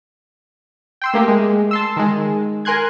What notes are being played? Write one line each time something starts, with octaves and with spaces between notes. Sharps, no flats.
G5 C6 E6
A3 A#3 G4
G#3
A5 C6 E6
D#3 G#3
A#4 G#5 C6 F#6 G#6